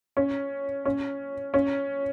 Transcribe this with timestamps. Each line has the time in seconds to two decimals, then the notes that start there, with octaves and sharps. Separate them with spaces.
0.17 C#4
0.85 C#4
1.54 C#4